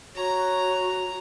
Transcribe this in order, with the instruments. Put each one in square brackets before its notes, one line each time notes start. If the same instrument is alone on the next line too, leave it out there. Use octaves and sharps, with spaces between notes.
[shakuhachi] F#4 [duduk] C#5 [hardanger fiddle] A#5